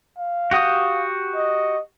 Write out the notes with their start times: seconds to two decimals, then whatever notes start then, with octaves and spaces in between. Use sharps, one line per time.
0.19 F5
0.51 F#4 G4 D#6
1.35 D#5